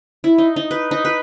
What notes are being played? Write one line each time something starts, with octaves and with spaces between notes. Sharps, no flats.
E4
D#4
D#4
B4
D#4
B4